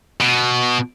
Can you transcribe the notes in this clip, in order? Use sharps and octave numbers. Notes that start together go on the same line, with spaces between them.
B2